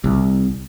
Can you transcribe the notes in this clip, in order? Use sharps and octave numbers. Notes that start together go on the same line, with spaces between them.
C2